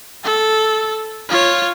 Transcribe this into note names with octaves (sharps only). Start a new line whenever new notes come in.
A4
F4 C#5